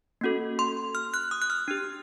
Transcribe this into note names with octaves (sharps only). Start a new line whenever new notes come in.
A#3 C#4 F#4 A4
C6
F6
F#6
D#6
F#6
F6
D4 G4